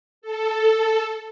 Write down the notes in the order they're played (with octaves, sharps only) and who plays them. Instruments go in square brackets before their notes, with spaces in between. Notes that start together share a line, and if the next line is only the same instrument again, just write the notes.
[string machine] A4